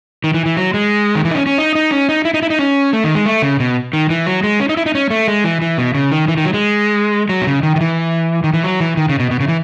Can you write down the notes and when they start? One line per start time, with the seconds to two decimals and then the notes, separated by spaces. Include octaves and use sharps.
0.24 D#3
0.34 E3
0.46 E3
0.57 F#3
0.74 G#3
1.15 D#3
1.25 E3
1.31 D#4
1.35 C#4
1.46 C#4
1.58 D#4
1.75 D#4
1.91 C#4
2.09 D#4
2.25 E4
2.34 D#4
2.43 E4
2.50 D#4
2.59 C#4
2.93 A3
3.04 D#3
3.15 G#3
3.26 A3
3.42 C#3
3.60 B2
3.93 D#3
4.10 E3
4.26 F#3
4.44 G#3
4.60 C#4
4.69 D#4
4.77 E4
4.86 D#4
4.95 C#4
5.10 A3
5.28 G#3
5.44 E3
5.62 E3
5.78 B2
5.94 C#3
6.11 D#3
6.28 E3
6.37 D#3
6.45 F#3
6.54 G#3
7.29 F#3
7.41 B2
7.47 C#3
7.63 D#3
7.76 D#3
7.81 E3
8.44 D#3
8.53 E3
8.64 F#3
8.80 E3
8.97 D#3
9.09 C#3
9.20 B2
9.31 B2
9.40 C#3
9.48 E3